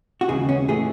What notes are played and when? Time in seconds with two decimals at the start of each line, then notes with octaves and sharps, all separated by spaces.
0.21 F#4
0.28 D#2 C#3 E3 G#3 G#4
0.49 C#4
0.68 A2 E3 A3 G#4